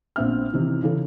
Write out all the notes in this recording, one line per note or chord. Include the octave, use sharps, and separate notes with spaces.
A#1 B3 C4 E5 F6
C3 D#3 E3
C#3 E3 A4